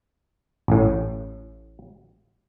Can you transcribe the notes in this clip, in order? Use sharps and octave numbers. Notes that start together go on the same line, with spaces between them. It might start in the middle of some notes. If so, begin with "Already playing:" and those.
A1 A2